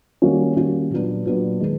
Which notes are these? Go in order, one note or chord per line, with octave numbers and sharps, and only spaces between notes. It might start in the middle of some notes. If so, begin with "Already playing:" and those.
D#3 G3 A#3 C#4 F#4
D#3 G3 A#3 C#4 F#4
A#2 F#3 B3 D4
A#2 F#3 B3 D4
D#3 G#3